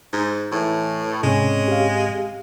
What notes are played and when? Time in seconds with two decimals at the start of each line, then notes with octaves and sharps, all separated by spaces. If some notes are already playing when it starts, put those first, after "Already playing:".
0.13 G#2
0.52 A2 E3
1.23 G#2 C3 G#3 C4 C#4
1.68 G4 F5